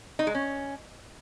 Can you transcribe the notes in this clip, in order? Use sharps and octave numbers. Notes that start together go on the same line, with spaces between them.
D#4
G#3
C#4